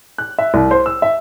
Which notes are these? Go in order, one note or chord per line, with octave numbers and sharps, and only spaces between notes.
F#6
E5
C2
C5
E6
E5